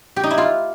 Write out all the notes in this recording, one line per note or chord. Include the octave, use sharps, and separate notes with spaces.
G4
D#4
E4
F4